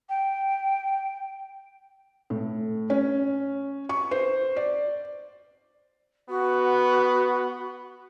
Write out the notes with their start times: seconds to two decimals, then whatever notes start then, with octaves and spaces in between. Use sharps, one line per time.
0.09 G5
2.30 A2
2.90 C#4
3.89 C#6
4.11 C5
4.56 D5
6.29 B3 F#4